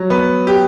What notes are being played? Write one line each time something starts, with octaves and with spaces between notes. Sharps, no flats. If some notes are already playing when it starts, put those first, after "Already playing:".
Already playing: F#3
B3
G4